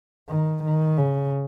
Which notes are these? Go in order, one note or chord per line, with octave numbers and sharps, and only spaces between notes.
D#3
D#3
C#3